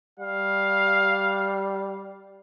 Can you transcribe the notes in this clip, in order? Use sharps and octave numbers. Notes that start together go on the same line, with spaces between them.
G3 F5